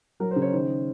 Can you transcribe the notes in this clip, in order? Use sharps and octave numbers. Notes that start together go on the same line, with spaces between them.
F#3 A#4
C5
C#3
C#5
D#3 C5